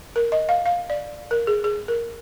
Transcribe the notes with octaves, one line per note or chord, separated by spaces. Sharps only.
A#4
D#5
F5
F5
D5
A#4
G#4
G#4
A#4